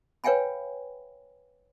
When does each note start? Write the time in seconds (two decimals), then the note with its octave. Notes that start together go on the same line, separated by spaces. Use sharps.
0.24 B4 C#5 F5 G5 G#5 B5